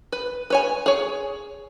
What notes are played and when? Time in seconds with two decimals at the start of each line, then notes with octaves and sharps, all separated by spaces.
0.12 B4
0.50 B4 C#5 G#5
0.86 G#4 C#5